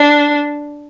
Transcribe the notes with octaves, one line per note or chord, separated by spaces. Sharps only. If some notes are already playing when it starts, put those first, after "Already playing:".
Already playing: D4